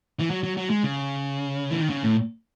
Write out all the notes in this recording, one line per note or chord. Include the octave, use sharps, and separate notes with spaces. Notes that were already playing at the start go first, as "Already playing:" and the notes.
E3
F#3
F#3
F#3
G#3
C#3
E3
D#3
C#3
A2